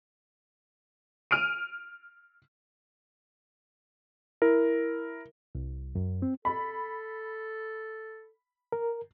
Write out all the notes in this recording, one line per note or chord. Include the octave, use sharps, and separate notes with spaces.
F6 D7 D#7
E4 A#4
C2
F#2
C4
A4 B5
A#4